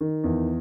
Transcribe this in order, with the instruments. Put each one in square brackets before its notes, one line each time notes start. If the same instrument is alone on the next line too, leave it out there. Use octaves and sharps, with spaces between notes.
[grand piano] D#3
E2